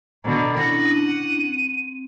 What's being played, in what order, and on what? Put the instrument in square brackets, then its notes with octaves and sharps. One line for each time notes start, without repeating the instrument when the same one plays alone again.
[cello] B2 D3 [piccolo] A#5
[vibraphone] C#4 D4 E4 [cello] F#5 [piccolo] A#6
[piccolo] D#7
[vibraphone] C4